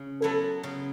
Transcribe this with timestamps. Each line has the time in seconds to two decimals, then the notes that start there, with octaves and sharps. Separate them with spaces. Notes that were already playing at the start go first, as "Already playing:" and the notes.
Already playing: C#3
0.21 F#3 B3 E4 A4
0.63 C#3